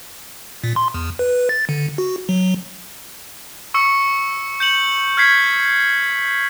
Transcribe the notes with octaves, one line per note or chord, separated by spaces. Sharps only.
A#2
C6
E2
B4
A6
D3
F#4
F#3
C#6 E6 C#7
G6 C#7 F#7
F6 G6 G#6 B6 C7